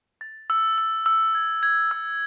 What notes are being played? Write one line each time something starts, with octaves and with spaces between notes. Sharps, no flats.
A6
E6
E6
E6
G#6
G#6
E6